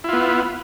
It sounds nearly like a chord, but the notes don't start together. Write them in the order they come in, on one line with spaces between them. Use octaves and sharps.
E4 F4 B3